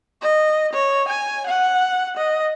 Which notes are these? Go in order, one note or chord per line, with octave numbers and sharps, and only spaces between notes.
D#5
C#5
G#5
F#5
D#5